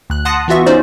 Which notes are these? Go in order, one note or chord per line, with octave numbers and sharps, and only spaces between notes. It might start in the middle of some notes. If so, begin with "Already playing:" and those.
D2 F#6
F#5 A5 C6 D#6 F#6 A#6
E3 B3 F4 F#4 E5 C#6
C#4 D#4 F#4 C5 D5